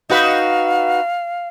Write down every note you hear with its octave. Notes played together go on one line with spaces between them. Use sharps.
D#4 F#4 B4 F5